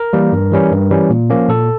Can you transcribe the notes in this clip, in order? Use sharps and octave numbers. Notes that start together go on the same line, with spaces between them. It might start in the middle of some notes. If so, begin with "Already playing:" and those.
Already playing: A#4
E3 G3 A#3
G2
E3 G3 C#4
G2
E3 G3 C#4
A#2
F3 A#3 C#4
A#2 A4